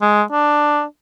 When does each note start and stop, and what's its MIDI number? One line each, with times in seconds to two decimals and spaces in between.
0.02 0.22 56
0.32 0.83 62